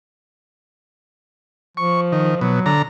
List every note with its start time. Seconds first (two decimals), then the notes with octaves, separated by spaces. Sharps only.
1.77 F3 C#6
2.12 D#3
2.41 B2 F#3
2.66 D3 A#5